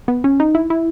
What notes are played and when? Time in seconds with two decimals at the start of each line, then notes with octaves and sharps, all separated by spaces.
0.08 B3
0.24 C#4
0.40 D#4
0.55 E4
0.70 E4